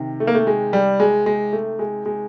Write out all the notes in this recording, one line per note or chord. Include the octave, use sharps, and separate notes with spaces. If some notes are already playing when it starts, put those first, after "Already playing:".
Already playing: C3 D#3
A3
A#3
A3
G#3
G3
G#3
G#3
A3
G#3
G#3